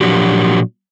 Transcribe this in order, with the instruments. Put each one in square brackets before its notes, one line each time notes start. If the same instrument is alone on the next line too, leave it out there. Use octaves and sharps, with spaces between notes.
[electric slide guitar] A#2 F3 F#3 D4 F#4 G4